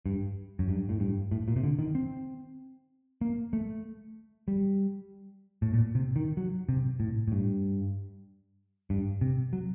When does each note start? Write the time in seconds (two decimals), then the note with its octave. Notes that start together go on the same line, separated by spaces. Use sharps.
0.06 G2
0.59 F#2
0.69 G2
0.89 A2
1.00 G2
1.31 A2
1.48 A#2
1.56 C3
1.63 D3
1.79 D#3
1.95 C4
3.21 A#3
3.53 A3
4.48 G3
5.62 A2
5.74 A#2
5.95 C3
6.16 D#3
6.37 F#3
6.69 C3
7.00 A2
7.28 A2
7.32 G2
8.90 G2
9.21 C3
9.53 F#3